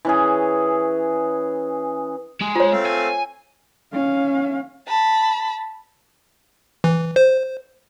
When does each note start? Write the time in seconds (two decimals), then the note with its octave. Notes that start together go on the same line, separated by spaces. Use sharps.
0.05 E3 C#4 G#4
2.41 G#3 G#4
2.56 F4 C#5
2.72 A3 C4 F5
2.86 G#5
3.93 C#4 F5
4.87 A5 B5
6.84 E3
7.16 C5